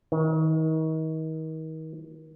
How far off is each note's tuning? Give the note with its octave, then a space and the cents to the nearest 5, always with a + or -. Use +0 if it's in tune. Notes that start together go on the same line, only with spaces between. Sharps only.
D#3 +35